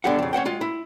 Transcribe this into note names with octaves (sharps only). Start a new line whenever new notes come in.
D3 G#3 B3 G4 F5 F#5
F2 C#3
C#4 C5 F#5 G5
G#3 F4
E4